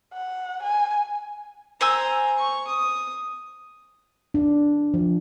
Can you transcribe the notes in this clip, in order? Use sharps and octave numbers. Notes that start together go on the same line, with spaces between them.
F#5
G#5
C5 G#5 A#5 E6
C#6
D#6
D4
F3